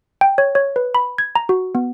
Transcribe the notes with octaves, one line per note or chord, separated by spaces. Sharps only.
G5
C#5
C#5
B4
B5
G#6
A#5
F#4
B3